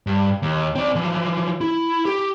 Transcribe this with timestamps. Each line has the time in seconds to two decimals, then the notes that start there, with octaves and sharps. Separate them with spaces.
0.07 G2
0.42 D#2
0.75 C4 D5
0.95 E3 F3
1.61 E4
2.05 G4